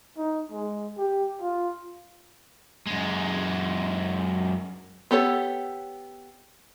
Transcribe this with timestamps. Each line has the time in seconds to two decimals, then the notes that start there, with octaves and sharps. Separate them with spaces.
0.18 D#4
0.52 G#3
0.98 G4
1.41 F4
2.87 F#2 G#3
5.11 B3 G4 A4 C#5